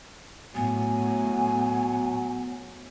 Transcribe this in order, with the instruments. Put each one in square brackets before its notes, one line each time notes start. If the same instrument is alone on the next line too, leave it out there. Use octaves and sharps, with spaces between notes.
[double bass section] A2 [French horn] F#3 [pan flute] B3 [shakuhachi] G#5